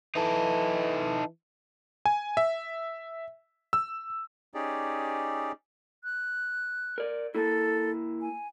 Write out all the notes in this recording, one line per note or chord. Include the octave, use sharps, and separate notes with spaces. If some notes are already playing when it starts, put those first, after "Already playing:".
E3 D#4 A4
G#5
E5
E6
C#4 D#4 G4 G#4 D5
F#6
A#4 D5
A#3 E4 A4
G#5